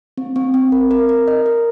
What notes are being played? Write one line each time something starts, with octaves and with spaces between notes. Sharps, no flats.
C4
C4
C4
A#4
A#4
A#4
D#5
A#4